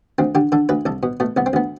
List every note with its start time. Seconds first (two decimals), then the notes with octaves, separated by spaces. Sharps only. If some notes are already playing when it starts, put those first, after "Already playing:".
0.18 D2 C4
0.35 D3 G4
0.52 D3 A4
0.69 D2 B4
0.86 C2 A4
1.03 B2
1.20 B2 A3
1.37 C2 B3
1.46 C4
1.53 D2 B3